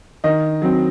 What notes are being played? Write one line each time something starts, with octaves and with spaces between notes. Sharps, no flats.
D#3 D#5
F#3 C4